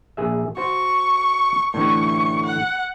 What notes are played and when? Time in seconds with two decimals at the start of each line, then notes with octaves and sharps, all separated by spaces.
0.17 A#1 G#4 E5
0.57 F#4 C5 C#6
1.74 A2 D3 E3 C#6
2.46 F#5